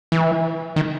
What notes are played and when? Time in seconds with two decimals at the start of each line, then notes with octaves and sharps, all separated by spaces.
0.12 E3
0.76 D#3